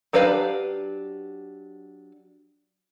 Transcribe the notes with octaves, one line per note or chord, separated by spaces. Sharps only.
F#3 D4 G4 B4 F5